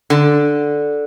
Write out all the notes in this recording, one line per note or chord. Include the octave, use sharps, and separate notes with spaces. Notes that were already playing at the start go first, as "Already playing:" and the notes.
D3